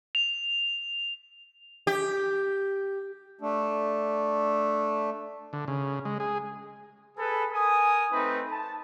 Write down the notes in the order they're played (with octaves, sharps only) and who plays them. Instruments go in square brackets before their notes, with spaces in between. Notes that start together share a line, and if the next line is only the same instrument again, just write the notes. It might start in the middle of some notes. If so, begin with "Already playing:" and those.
[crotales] F7
[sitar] G4
[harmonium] A3 D4
[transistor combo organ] D3
C#3
G#3
G#4
[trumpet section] G#4 A4 B4
A#4 G#5 D#6
A3 C4 D#4 B4
A5